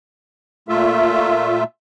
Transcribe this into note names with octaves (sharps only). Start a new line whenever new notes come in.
A#2 A3 F4 E5